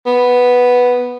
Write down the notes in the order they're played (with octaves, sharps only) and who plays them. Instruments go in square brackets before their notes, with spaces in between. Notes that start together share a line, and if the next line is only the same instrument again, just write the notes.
[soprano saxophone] B3